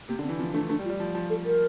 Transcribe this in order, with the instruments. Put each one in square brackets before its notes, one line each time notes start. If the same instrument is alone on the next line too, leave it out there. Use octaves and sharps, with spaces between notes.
[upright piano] C3 [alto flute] A#3
[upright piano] D3
[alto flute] C4
[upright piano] E3
[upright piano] F3 [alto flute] C4
[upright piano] A3 [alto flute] D4
[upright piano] A3 [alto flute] D4
[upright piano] G3
[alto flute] F4
[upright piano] G3
F3
F3
[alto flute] A4
A#4